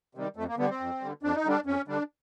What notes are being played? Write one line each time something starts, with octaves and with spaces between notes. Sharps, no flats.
C3 D#3 G3
F2 A3
A#3
D3 G3 B3
C4
F2
D3 G3
F2 D4
D#4
D3 G3 D4
F2 C#4
D3 G3 D4